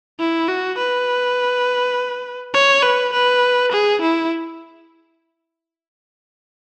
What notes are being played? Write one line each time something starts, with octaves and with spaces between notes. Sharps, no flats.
E4
F#4
B4
C#5
B4
B4
G#4
E4